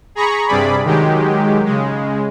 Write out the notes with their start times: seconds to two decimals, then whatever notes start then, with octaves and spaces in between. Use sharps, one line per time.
0.15 G#4 A#5 B5 C#6
0.47 G2 C3 G3 G#4 D5 B5
0.85 D#3 F#3 G#3 G4
1.66 C#3 G#3